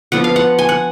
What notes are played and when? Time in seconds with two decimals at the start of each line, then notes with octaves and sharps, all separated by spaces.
0.12 F3 B3 D4 F#5
0.24 F5
0.36 F#5
0.59 G#5
0.69 F#5